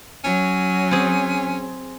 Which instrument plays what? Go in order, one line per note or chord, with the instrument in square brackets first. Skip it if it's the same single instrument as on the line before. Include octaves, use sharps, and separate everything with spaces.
[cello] F#3 [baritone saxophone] C#4
[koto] C4 G#4